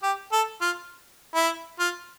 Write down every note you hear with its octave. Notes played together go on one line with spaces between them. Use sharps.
G4
A4
F4
E4
F4